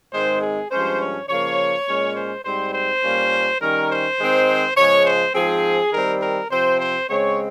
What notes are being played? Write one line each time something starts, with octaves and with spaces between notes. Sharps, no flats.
G#2 D#3 G#3 C4 C5
G#4
G2 F3 G#3 C#4 C5
C#5
C#3 F3 A#3 C#5
A#2 G#3 C#4
C5
G#2 G3 C4 C5
C5
A#2 G3 A#3 C#4
D#3 G3 C#4 A#4
C5
D#3 G#3 C4
C#3 F3 G#3 C#5
C5
G#2 F3 C4 G#4
D#3 G3 C4 A#4
A#4
C3 F3 C4 C5
C5
C#3 G#3 C4 C#5